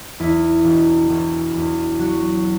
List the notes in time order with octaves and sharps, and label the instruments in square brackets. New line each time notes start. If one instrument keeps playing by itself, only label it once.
[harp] E2 E4
E1
E1
E2
F#3 F#4